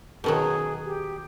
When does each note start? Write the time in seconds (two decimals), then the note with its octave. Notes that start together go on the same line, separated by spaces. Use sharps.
0.24 B2 D#3 F#3 G#4
0.85 G4